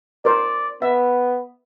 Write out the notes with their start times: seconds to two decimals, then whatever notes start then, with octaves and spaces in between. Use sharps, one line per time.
0.25 A#4 C5 D5
0.82 B3 E5